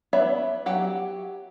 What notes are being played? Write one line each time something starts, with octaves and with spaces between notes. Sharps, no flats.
B3 C#5 D5 E5 B5
F#3 G4 F#5